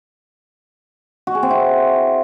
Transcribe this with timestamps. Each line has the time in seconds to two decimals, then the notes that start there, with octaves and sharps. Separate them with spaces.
1.27 F#4
1.35 G#4
1.43 C4
1.50 E4